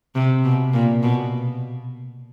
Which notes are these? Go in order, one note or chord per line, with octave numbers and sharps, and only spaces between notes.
C3
B2
A#2
B2